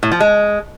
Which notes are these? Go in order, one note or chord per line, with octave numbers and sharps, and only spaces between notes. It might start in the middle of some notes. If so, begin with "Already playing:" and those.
A2
F3
G#3